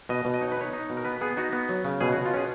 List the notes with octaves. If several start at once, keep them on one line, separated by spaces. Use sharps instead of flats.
B2 D#5
B2
D#5
D#4 C#5
B4
D#4 C#5
D#4
B2
A#4
B3 B4
B3 G#4
D#4 F#4
B3
F#3
C#3
B2 G#4
F#4
B2
F4
C#4 G#4